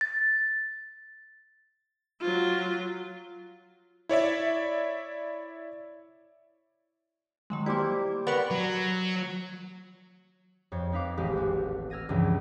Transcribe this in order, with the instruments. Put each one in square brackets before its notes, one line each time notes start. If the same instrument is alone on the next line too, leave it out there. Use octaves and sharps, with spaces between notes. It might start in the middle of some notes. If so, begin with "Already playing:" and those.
[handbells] A6
[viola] F#3 F4
[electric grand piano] E4 C#5 D5 E5
[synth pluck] D#3 F#3 G#3
[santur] G3 C5 D6 [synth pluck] A#3 E4
[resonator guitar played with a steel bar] B3 [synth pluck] A#4 D5 C#6
[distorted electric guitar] F#3
[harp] F2 C#5
C4 D#4 B4 F5 D6
D#1 A1 G#3 A3 G4 F5
F#4
E6 F6 G#6 A#6 D#7
C#2 G2 E3 F3 G3